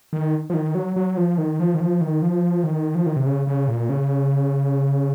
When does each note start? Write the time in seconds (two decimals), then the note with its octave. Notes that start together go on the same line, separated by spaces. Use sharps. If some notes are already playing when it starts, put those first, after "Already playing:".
0.13 D#3
0.50 F3
0.54 D#3
0.75 F#3
0.96 F#3
1.17 F3
1.38 D#3
1.60 F3
1.74 D#3
1.80 F3
2.01 D#3
2.22 F3
2.64 D#3
2.95 F3
3.06 D#3
3.16 C3
3.26 C#3
3.47 C#3
3.68 A#2
3.89 C#3